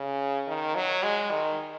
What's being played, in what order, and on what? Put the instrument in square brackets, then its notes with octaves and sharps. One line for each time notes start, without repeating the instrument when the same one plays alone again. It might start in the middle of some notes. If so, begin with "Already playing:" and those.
Already playing: [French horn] C#3
D#3
F#3
G#3
D#3